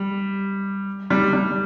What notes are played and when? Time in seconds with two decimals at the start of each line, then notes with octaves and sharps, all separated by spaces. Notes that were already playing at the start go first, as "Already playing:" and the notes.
Already playing: G3
1.10 G3
1.33 G3